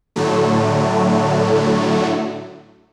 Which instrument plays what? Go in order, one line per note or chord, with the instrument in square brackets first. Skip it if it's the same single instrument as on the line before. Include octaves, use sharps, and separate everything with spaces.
[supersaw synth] A2 D3 F#3 A3